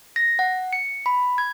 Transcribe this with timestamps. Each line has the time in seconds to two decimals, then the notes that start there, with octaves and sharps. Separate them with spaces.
0.16 A#6
0.39 F#5
0.73 C#7
1.06 B5
1.38 G#6